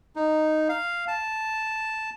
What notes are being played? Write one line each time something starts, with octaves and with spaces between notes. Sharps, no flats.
D#4
F5
A5